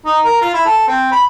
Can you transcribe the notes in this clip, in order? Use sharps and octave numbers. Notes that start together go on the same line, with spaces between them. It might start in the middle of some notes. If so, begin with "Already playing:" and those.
D#4
A#4
F4
E4
A4
C4
B5